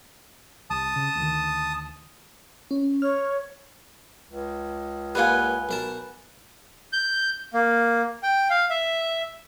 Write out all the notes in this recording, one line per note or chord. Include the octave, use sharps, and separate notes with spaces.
C2 A5 D#6
C#3
D2 D#3
C#4
C#5 F6
C#2
G3 A#3 F4 B4 F#5 G#5
B1 A#4 A5
G6
A#3
G5
F5
E5